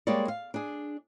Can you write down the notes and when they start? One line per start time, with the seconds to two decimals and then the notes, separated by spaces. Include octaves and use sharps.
0.07 G3 G#3 A#3 C#5 D5
0.28 F5
0.54 D4 G#4